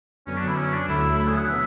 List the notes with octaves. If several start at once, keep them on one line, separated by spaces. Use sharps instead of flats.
F#2 D3 F#3 B3 C#4
D4
E4
C#4
D4
D2 D3 F#3 A3 E4
E4
G#4
F#5
B2 F#3 B3 E5